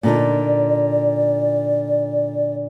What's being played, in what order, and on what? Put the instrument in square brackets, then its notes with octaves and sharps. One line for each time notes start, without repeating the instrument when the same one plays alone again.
[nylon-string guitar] A#2 D3 D#4 [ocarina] D5